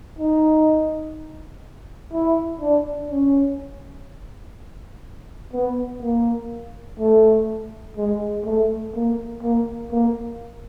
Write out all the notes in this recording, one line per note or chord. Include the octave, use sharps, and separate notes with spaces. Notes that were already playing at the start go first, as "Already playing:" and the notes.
D#4
E4
D4
C#4
B3
A#3
A3
G#3
A3
A#3
A#3
A#3